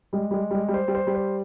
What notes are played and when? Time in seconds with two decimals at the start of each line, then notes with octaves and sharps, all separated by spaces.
0.13 G3 G#3
0.31 G3 G#3
0.51 G3 G#3
0.68 G3
0.74 C5
0.88 G3
0.95 C5
1.07 G3
1.15 C5